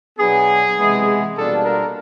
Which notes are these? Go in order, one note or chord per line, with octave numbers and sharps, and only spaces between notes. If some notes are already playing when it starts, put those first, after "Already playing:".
B2 F#3 B3 D4 G#4
C3 E3 G#3 B3 E4
B2 G3 A#3 D4 F4 A4
A#4